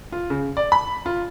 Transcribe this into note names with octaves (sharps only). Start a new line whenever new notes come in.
F4
C#3
D5
B5
F4